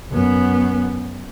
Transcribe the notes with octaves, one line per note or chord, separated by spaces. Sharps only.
F#2 B3